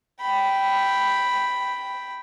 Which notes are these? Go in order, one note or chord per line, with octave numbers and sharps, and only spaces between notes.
G5 B5